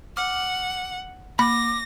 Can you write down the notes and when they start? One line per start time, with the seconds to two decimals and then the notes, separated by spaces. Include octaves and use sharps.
0.17 F#5 D6 F6
1.39 A#3 B5 D6 A#6